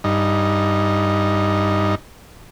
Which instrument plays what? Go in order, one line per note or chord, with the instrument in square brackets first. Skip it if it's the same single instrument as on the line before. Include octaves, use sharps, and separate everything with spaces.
[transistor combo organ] G2 D#4